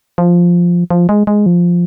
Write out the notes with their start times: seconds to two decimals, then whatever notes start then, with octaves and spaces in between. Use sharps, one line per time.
0.18 F3
0.90 F3
1.09 G#3
1.27 G#3
1.46 F3